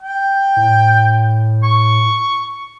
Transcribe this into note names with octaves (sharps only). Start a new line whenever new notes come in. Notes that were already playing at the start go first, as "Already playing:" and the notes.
G5
A2
C#6